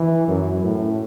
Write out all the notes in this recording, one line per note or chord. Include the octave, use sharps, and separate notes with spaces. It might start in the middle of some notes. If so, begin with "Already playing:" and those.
Already playing: E3
F#2
A2